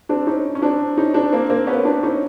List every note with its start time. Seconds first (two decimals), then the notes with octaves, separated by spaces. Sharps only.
0.09 C4 D4
0.27 C#4 D#4
0.55 C#4
0.62 C4 D4
0.97 C#4 D#4
1.14 C4 D4
1.32 A#3 C4
1.50 A#3 C4
1.67 B3 C#4
1.85 C4 D4
2.03 C#4 D#4